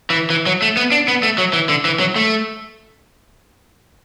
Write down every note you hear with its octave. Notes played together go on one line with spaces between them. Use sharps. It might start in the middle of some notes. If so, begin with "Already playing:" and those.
E3
E3
F#3
A3
B3
D4
B3
A3
F#3
E3
D3
E3
F#3
A3